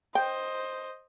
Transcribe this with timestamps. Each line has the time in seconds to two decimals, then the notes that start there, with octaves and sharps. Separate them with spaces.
0.15 C5 D#5 G5